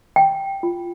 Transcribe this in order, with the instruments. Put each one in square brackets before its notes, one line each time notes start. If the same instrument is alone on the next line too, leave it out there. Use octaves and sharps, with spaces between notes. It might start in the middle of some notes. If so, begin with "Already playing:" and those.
[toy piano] G5
F4